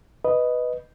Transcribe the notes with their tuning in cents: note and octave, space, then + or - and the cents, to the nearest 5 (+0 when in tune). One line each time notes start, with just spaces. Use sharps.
B4 +0 D#5 +0